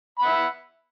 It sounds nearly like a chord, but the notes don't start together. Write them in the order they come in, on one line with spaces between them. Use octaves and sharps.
B5 F#5 E5